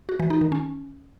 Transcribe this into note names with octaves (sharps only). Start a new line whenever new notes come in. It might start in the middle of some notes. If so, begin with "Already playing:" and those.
F#4
E3
D#4
D#3
C#4